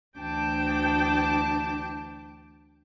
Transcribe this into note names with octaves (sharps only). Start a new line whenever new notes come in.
D2 E3 D4 G5 A5 D6